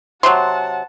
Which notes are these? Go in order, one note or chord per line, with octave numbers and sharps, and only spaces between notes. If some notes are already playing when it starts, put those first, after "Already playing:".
C3 F#3 F#5 A5 C6